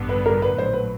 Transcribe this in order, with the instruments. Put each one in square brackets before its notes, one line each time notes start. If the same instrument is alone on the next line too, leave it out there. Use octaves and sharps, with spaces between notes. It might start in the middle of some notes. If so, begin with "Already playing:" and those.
Already playing: [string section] A1 G2 D3 G3 B3
[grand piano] B4
A#4
B4
[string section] A#1 A2 F#3 [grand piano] C5
[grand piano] B4